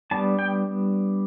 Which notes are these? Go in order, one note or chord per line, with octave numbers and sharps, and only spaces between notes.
G3 B3 D4 A5
G5